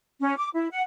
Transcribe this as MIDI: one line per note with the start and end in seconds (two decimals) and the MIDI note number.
0.20 0.34 61
0.37 0.48 86
0.54 0.66 64
0.71 0.80 78